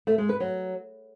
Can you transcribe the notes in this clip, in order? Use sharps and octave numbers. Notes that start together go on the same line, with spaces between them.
A3
G#3
B4
F#3